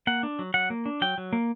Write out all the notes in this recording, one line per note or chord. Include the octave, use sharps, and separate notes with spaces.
A#3 F#5
D4
F#3
F#3 F#5
A#3
D4
F#3 G5
F#3
A#3